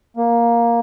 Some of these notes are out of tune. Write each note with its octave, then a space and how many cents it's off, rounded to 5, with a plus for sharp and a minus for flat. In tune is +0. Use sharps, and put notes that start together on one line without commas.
A#3 +10